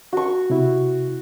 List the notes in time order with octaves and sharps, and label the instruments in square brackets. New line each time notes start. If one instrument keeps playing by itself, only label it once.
[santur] F#4 C#6
[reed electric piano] C3 E4